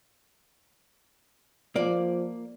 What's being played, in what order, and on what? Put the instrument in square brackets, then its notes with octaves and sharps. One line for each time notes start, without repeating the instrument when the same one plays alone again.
[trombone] F3 [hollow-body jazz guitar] A#3 D5